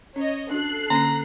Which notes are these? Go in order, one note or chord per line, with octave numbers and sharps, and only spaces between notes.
C#4 C#5 D#5
D4 F#4 A4 F#6 C7
D3 A#3 C#4 A#5